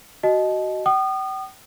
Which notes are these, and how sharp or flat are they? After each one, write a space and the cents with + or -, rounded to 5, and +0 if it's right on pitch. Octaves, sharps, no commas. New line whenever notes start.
F#4 +20 D#5 +0 A5 -35
G5 -40 D#6 -35